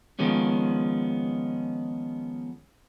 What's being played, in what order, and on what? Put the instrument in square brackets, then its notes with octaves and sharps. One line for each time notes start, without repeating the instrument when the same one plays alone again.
[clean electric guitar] D#3 F3 G#3 B3 C#4